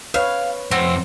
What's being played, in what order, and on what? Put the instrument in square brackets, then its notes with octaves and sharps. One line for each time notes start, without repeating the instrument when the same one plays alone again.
[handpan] B4 C#5 [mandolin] F5
[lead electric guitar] F2 F#5 [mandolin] C4